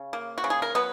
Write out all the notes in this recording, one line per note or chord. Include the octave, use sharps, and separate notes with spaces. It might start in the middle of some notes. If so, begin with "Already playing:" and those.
Already playing: C#3
A#3
F#4
C#3
G#4
A#4
F#3 B3 B4